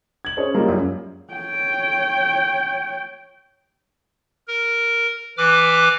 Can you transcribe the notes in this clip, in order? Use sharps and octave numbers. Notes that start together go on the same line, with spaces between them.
G#6 F#7
C#4 G#4 C5 C#5
G3 G#3 A#3 F4
F#2
C#5 G5
A#4
E3 B4 D6 F6